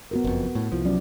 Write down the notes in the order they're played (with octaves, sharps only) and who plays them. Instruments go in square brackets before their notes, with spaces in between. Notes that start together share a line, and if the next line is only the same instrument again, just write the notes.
[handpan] B3 F#4 A#4
[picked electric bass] F#1 F2
A2
[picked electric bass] C2 F3 [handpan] E4
[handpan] F#3 C#4 D5